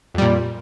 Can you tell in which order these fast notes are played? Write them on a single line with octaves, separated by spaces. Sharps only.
F2 G3 A#2